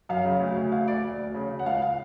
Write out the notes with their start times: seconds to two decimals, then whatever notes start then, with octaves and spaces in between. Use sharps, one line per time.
0.09 F#2 F5
0.25 C#3
0.40 D2
0.57 D2
0.72 D2 F5
0.87 D2 D5
1.03 D2
1.19 D2
1.34 C#3
1.50 C#3
1.59 F#5
1.66 C#2 F5
1.82 F5